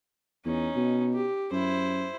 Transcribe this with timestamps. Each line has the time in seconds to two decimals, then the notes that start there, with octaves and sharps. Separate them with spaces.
0.45 E2 C#4 D#4
0.76 B2
1.14 G4
1.52 F#2 E4 C5